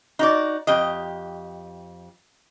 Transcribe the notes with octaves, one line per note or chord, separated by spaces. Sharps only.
D#4 F#4 D5
F2 G4 D#5